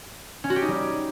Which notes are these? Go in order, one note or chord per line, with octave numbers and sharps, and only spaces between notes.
C#4
F#4
G4
D#4
G3